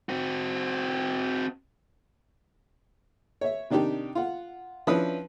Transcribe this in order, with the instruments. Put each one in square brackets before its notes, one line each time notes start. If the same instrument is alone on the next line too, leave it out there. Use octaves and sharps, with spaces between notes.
[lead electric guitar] C4 F#4
[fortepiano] C#5 E5
C3 D#3 D4 D#4 G4
F4 F#5
F3 C#4 D4 E4 B4 D#6